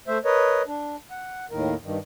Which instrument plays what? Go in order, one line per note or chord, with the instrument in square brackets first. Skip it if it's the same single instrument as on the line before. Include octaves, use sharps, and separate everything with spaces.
[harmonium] A3 C5 E5
A#4 B4 C#5 D#5
D4
F#5
D#2 A2 D#3 A#4
G2 D#3